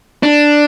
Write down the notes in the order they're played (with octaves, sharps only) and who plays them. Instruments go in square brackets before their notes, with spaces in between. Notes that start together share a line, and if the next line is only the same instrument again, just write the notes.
[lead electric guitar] D4